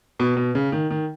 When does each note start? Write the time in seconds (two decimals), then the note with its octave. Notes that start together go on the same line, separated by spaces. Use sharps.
0.20 B2
0.37 B2
0.55 C#3
0.72 D#3
0.90 D#3